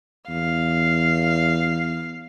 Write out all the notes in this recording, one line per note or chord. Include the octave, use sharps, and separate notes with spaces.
E2 F5